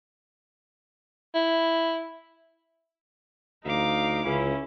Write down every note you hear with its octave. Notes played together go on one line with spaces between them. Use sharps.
E4
D2 D#4 F5 D6
C#2 C#4 E4